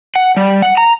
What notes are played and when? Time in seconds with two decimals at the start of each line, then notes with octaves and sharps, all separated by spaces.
0.16 F#5
0.37 G3
0.62 F#5
0.77 A#5